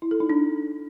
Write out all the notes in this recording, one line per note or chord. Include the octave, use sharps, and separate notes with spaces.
E4
A4
D#4
D4